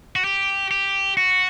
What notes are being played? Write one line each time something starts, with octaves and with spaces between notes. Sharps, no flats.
F#4
G4
G4
F#4